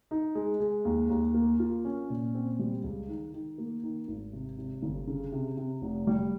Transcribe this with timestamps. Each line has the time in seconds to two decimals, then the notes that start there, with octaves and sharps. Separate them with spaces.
0.11 D#4
0.35 G#3
0.60 G#3
0.85 D#2
1.10 D#2
1.34 A#3
1.59 F4
1.85 C#4
2.10 A#2
2.34 C4
2.59 G3
2.84 C#2
3.09 D#3
3.33 D#3
3.58 A#3
3.83 D#3
4.08 G#1
4.33 C3
4.58 C3
4.82 G1
5.07 C#3
5.32 C3
5.57 C3
5.82 F1
6.07 G3